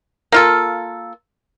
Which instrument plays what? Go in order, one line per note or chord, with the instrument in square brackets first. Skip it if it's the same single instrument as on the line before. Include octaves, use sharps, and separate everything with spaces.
[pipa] A#3 F4 A4